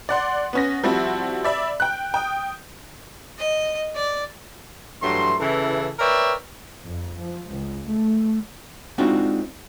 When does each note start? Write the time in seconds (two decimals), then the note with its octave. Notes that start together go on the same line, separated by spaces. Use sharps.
0.09 D5 F#5 C6
0.53 B3 C#4 A#6
0.84 F3 G3 C4 E4 F#4
1.45 D5 E5 B5
1.80 G5 F#6
2.14 G5 D#6
3.39 D#5
3.96 D5
5.02 G2 E3 F#3 A3 C6
5.39 C#3 E3 A4
5.99 A#4 B4 C#5 D5 E5 G5
6.85 F2
7.22 F3
7.55 C#2
7.88 A3
8.98 G#3 C4 D4 D#4 F4 F#4